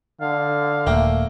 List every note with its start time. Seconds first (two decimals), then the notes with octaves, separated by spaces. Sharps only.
0.21 D3 F5
0.87 D#1 A3 A#3 G5